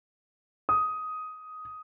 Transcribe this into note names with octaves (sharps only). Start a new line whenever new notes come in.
D#6